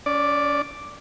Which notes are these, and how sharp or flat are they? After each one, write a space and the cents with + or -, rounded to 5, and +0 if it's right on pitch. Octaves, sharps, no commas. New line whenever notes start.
C#4 +35 D5 +0